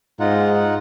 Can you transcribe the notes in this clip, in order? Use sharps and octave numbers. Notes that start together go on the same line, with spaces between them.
G#2 D#4 F4 F#5